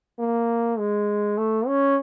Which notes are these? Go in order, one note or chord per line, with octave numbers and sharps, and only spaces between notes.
A#3
G#3
A3
C#4